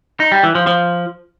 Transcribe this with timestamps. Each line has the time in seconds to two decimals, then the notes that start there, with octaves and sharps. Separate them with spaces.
0.20 D#4
0.32 G3
0.43 E3
0.55 F3
0.67 F3